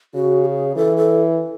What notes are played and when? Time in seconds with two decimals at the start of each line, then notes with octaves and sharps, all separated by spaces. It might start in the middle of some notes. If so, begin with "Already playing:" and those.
0.15 C#3 F#4
0.45 G#4
0.76 E3 A4
0.97 A4